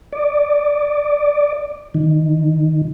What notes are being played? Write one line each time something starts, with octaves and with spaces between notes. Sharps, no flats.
D5
D#3